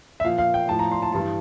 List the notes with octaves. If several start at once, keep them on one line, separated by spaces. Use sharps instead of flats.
E5
A#2 F3 F5
F5
G5
A2 F3 A5
A#5
C6
A5
G2 E3 G3 A5